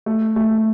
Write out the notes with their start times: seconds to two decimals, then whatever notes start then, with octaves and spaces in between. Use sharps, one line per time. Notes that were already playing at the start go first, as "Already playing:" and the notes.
0.06 A3
0.36 A3